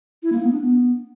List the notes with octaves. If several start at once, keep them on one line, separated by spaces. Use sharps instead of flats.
E4
A#3
B3
D4
B3